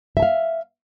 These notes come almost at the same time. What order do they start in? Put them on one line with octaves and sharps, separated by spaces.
E5 A5 F5